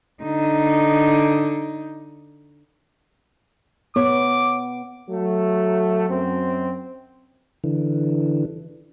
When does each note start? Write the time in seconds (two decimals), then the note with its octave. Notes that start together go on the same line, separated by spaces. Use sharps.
0.23 D3 D#4
3.96 B3 C#5 D6
5.10 F#3 A3
6.10 F#2 C4
7.64 D3 E3